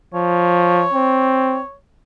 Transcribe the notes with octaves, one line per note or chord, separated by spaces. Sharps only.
F3 C#5
C4